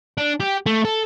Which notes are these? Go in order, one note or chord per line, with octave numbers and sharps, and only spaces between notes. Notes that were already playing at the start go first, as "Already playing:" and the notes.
D4
G4
A3
A4